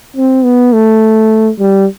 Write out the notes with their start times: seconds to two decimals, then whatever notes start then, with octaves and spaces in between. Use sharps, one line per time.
0.16 C4
0.44 B3
0.73 A3
1.59 G3